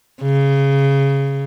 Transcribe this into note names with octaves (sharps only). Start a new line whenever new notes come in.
C#3